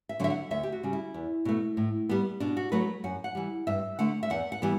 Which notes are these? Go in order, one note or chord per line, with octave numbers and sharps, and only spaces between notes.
E5
D3 F#3 E5
F#5
D2 E5
G4
F#4
C#3 G3
E4
E2
B2 A3
A2
G3 B3
B2 D4
F#4
F#3 A3 B4
F#2 F#5
F#5
E3 G3
G2 E5
D3 A3 F#5
E5
E2 F#5
F#5
E3 G3 B3